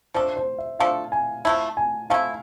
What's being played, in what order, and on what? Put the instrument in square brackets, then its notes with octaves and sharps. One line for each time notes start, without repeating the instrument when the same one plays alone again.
[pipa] F3 A3 D4 A4 [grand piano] C5
[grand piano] C5
E5
[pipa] F3 A3 D4 A4 [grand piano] F5
[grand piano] G#5
[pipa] F3 A3 E4 [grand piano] A5
[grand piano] G#5
[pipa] F3 A3 E4 [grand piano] F5